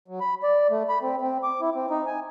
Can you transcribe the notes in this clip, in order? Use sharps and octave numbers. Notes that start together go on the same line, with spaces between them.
F#3
B5
D5
A3
B5
C4
C4
D6
E4
C4
D#4
G#5